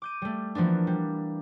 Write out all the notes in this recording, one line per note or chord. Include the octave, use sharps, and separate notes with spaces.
D6 G6 D#7
G3 A3
E3 F3 A#3 B3 D4
G3